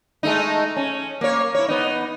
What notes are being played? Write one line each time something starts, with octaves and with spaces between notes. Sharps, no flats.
G#3 A3 D#4
C#4
A#3 C#5
E4 C#5
B3 D#4